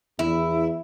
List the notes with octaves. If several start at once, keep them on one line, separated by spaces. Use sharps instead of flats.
E2 E4